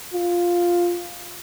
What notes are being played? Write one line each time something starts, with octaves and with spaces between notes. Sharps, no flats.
F4